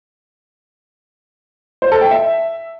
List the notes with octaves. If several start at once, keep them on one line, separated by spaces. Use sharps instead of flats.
C5
A4
G5
E5